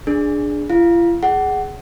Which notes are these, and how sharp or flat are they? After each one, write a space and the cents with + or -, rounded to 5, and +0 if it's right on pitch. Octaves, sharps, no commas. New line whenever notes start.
D4 +0 G#4 +0
F4 -45 F5 +0
G#4 +0 F#5 +25